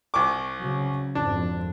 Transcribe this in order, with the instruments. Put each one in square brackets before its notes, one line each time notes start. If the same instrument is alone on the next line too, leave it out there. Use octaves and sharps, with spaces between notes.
[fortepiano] C2 C#6 D6
[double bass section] C#3 F#3
[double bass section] G#1 F2 [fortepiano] D4